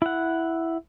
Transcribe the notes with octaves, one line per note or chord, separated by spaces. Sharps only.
E4 F#5